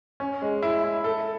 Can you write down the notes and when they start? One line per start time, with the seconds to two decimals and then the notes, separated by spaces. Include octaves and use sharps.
0.20 C#4
0.42 G#3
0.63 E4
0.84 E4
1.04 A4